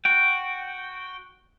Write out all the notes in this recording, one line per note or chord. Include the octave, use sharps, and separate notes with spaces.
F#4 G5